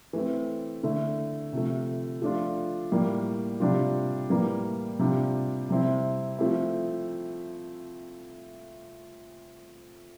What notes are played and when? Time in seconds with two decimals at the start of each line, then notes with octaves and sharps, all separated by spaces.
0.13 E3 A3 C4
0.83 D3 A3 E4
1.53 C3 F3 A3
2.22 F3 A3 D4 F4
2.91 A2 G3 A#3
3.60 C3 G3 D4 F4
4.30 A2 E3 G3 A#3
4.99 C3 G3 D4 F4
5.69 C3 G3 C4 E4
6.38 F3 A3 C4 E4